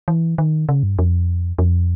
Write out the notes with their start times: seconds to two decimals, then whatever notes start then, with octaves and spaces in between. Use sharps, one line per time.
0.08 E3
0.38 D#3
0.69 C#3
0.83 G2
0.99 F2
1.59 F2